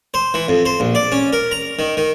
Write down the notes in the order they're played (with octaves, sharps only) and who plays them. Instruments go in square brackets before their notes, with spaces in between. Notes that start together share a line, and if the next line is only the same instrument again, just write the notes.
[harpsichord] C5
E3
F2
C5
A#1
D5
C#4
A#4
A#5
D#3
D#3